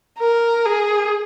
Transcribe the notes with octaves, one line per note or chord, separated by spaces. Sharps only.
A#4
G#4